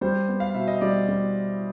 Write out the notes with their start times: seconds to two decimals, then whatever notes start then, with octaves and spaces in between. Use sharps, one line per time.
0.01 G3 C5
0.28 B3
0.40 F5
0.55 B2 E5
0.68 D#5
0.81 G3 D5
1.09 G3